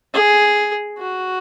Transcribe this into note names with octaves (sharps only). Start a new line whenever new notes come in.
G#4
F#4